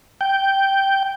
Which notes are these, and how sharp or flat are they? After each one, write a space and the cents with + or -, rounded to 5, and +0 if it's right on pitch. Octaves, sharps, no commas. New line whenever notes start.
G5 -5